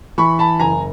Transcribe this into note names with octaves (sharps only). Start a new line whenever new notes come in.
E3 B5 C#6
A5 B5
F#1 G#5 A#5